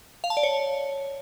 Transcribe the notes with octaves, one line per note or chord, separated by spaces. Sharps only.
F5
A5
D5
C#5